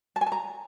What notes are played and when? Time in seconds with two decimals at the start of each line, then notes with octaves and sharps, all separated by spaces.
0.16 A5
0.21 G#5
0.26 A5
0.32 A#5